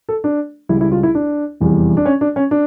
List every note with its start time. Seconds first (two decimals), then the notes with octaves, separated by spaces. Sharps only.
0.09 A4
0.24 D4
0.69 C#2 C#3 G3 E4
0.81 E4
0.92 F4
1.03 E4
1.15 D4
1.60 F1 E2 E3 G3
1.97 D4
2.06 C#4
2.21 D4
2.36 C#4
2.51 D4